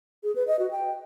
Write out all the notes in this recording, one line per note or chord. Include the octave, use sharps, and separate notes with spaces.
G#4
B4
D#5
F#4
G5